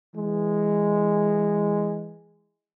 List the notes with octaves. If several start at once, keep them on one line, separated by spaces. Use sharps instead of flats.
E3 G#3